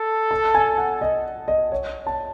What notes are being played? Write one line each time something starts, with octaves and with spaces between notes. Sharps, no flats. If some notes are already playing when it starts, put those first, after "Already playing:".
Already playing: A4
A5
G#5
F#5
D#5
D#5
C#5
A5